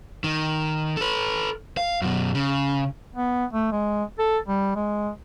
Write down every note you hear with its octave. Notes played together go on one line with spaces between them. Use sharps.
D#3
A4 B4
F5
F#2 B2
C#3
B3
A3
G#3
A4
G3
G#3